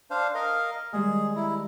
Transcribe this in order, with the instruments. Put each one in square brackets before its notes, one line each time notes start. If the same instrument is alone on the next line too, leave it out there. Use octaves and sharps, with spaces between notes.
[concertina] D4 C5 F5
A#4 D#5 F5
[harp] D#3 G3 G#3 [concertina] G#4
[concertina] E4 [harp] A#5